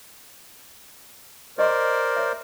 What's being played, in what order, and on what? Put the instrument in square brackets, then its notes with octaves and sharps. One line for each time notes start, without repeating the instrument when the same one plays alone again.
[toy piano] G4 D#5 [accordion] A#4 C5 D5
[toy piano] C#5 E5